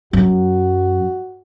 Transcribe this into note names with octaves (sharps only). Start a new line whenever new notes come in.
F#2 F#4